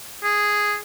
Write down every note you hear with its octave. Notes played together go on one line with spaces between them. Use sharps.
G#4